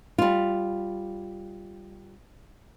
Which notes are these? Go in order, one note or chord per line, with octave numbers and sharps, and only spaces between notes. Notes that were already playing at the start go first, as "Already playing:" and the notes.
G3 F4